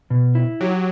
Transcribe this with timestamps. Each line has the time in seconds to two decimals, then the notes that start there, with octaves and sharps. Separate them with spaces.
0.10 B2
0.35 E4
0.61 F#3 G4